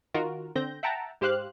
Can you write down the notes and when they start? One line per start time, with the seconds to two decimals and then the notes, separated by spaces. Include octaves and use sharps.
0.14 D#3 F4 F#4 A#4
0.56 D3 C4 G6 A#6
0.83 E5 F#5 G5 A5 A#5
1.21 G#2 G4 C5 F5 F#6